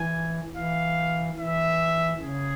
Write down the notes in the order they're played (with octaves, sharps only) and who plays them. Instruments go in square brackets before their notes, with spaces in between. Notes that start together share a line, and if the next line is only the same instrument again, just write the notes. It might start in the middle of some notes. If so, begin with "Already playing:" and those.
Already playing: [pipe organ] E3 [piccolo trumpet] G#5
[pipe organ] E3 [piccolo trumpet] F5
[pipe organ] E3 [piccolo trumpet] E5
[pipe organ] C#3 [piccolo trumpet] G#4